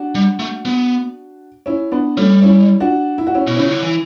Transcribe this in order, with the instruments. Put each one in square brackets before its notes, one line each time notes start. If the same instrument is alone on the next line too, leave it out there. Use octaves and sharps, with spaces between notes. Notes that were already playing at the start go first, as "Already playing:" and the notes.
Already playing: [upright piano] D4 F#4
[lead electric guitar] G3
A3
B3
[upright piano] C#4 E4
B3 D4
[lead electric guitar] G3 [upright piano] A3 C#4
[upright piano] C#4 E4
D4 F#4
E4
F#4
C#4 E4
[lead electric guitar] B2
[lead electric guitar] C#3 [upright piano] C#4 E4
[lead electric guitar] D3
E3